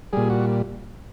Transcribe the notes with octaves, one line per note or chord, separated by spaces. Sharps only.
A#2 G3 G#4
F#4